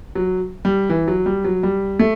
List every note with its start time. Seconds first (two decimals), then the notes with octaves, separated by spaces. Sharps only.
0.15 F#3
0.65 G3
0.90 E3
1.08 F#3
1.26 G3
1.44 F#3
1.63 G3
2.00 A3